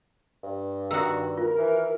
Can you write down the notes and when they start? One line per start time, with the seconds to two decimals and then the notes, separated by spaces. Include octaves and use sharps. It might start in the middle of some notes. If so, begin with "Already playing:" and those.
0.43 G2
0.91 D#3 F#4 E6
1.38 F4 A#4
1.58 E3